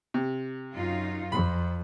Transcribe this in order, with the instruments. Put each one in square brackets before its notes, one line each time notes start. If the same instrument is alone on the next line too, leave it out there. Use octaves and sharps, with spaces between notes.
[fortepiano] C3
[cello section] F#2 D#4 F4
[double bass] F2 [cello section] F3 [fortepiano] B5